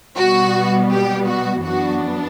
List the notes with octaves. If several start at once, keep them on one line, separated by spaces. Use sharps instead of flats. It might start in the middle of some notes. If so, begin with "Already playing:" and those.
B2 G3 B3 F#4
G4
F#4
F#2 E3 B3 D4 F#4